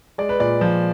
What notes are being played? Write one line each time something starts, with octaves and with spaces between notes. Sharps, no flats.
G#3 D5
B4
A#2 D5
F3